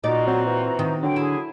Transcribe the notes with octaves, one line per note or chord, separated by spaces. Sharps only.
A#2 D#4 F4 F#4 D5 A#5
F#3 C4
E3
D#3
D3 F#3 G5
E4 G#4